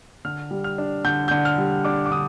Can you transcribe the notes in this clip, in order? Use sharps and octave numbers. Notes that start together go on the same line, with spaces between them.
D3 F6
G3
F6
D4
D3 G6
D3 G6
F6
G3
D4 D6
D6
D3 D#6